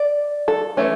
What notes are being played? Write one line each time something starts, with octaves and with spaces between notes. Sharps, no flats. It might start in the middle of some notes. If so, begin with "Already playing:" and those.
Already playing: D5
A4
E3 A3 C#4